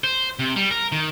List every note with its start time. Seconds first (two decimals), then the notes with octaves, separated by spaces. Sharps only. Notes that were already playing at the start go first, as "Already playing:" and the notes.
0.04 C5
0.39 C3
0.56 G3
0.71 A#4
0.92 D#3